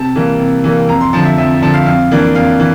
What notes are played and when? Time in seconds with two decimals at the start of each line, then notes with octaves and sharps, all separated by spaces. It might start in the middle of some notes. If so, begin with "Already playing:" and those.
Already playing: C3 A5
0.16 E3 G3 A#3
0.39 C3
0.64 E3 G3 A#3
0.89 F2 A#5
1.01 C6
1.13 D3 F3 A5
1.25 E5
1.38 F2 E5
1.62 D3 F3 A5
1.74 F5
1.87 F2 F5
2.11 E3 A#3 D4
2.35 F2 F5
2.60 E3